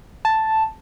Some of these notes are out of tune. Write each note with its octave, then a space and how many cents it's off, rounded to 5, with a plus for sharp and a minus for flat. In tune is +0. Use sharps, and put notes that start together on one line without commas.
A5 +0